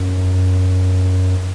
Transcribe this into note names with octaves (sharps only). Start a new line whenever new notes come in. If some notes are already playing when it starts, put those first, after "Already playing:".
Already playing: F#2